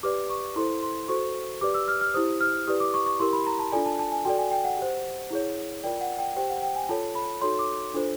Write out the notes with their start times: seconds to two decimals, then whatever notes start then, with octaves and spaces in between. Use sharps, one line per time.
0.03 G4 B4 D5 D6
0.30 C#6
0.56 E4 A4 C5 C6
0.83 C6
1.08 F#4 A4 C5 C#6
1.61 G4 B4 D5 D6
1.74 E6
1.88 F6
2.01 F6
2.14 E4 G4 C5 D#6
2.41 F6
2.67 E4 G4 B4 D5 D#6
2.80 D6
2.94 C#6
3.06 C#6
3.20 E4 G4 A#4 C6
3.33 B5
3.46 A#5
3.59 A5
3.72 D4 F4 A4 D5 G#5
3.86 A5
3.99 A5
4.12 G#5
4.25 F#4 A4 D5 G5
4.38 G#5
4.52 G5
4.64 F#5
4.78 G4 C5
5.31 E4 G#4 C#5
5.84 F4 A#4 D5 G5
6.01 F#5
6.19 G5
6.36 G4 C5 G5
6.50 F#5
6.62 G5
6.75 G#5
6.89 F4 A4 C#5 A5
7.15 B5
7.41 D#4 F#4 A4 C#5 C6
7.59 D6
7.94 D4 F4 A4 C5